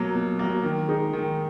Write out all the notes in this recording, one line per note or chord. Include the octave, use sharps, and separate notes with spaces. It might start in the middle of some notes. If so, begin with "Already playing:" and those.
Already playing: B2 F#3 A#3
B2
F#3 A#3
D#3
G#3 D#4
D#3